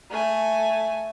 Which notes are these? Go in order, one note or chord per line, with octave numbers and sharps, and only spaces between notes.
A3 G#5